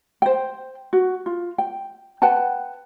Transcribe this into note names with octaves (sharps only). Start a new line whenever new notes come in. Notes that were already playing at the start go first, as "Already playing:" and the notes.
C5 G5
F#4
F4
G5
B4 F#5 G5 A5